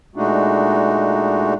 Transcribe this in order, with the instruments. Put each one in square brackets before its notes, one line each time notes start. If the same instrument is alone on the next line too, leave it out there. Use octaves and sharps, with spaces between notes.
[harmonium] A#2 G#3 A3 D4 D#4 F#4